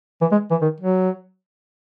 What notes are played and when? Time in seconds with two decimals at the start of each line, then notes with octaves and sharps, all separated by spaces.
0.21 E3
0.31 G#3
0.51 E3
0.61 D#3
0.80 F#3